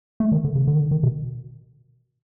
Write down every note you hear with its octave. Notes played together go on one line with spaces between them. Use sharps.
A3
D#3
D3
C#3
D3
D#3
D3
D#3
B2